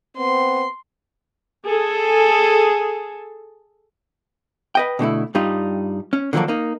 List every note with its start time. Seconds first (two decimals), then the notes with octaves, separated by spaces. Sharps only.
0.17 B3 C4 C6
1.66 G#4 A4
4.75 B4 D#5 G5
4.99 B2 D3 A3 E4
5.35 G2 G3 D#4 F4
6.13 C#4
6.33 D3 D#3 F3 F#3 A#3 D4
6.48 A#3 D#4